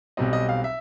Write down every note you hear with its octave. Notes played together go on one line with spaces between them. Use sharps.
B1 B2 G3 C4 D#5
D#5
F5
E5